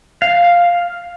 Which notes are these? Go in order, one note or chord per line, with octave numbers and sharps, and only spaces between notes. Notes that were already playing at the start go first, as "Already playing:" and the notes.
F5